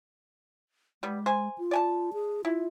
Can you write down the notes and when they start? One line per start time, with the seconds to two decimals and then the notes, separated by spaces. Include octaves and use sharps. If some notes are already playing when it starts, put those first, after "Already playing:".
1.03 G3 G#3 B3
1.26 C5 G#5
1.58 F4
1.71 D5 G#5 A5
2.13 G#4
2.45 E4 F4